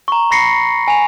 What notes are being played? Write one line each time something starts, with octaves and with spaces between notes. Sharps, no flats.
A#5 C#6
B5 C#6 A#6 C7 C#7
G#5 F7